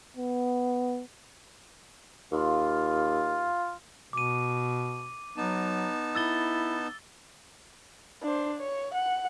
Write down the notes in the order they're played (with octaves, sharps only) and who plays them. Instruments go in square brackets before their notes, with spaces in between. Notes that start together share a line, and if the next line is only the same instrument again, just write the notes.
[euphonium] B3
[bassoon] D#2 [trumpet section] F4
[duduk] B2 [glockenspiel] D6 D#7
[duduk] F#3 [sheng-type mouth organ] B3 D#4 A5
[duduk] E4 [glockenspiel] E6 A6 G7
[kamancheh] D4 C5
C#5
F#5